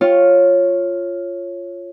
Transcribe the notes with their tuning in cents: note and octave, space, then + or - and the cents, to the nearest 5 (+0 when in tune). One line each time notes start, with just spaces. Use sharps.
F4 +0 C#5 -10